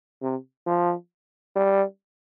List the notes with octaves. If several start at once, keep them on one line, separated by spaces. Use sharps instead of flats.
C3
F3
G3